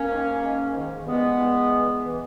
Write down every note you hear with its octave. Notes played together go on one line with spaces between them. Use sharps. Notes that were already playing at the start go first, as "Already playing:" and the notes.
Already playing: A#3 C#4
G#2 D#3
G#2 D#3
G#2 D#3
G2 E3 G#3 B3
G2 E3
G2 E3
E3